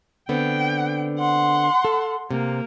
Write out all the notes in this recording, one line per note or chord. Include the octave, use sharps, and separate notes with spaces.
D3 B3 C4 G5
F#5 C6
A4
C3 A#3